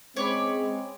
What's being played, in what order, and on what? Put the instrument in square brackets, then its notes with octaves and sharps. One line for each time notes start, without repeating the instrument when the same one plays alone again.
[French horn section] G#3 C4 C#4 [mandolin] C#5 D5 B5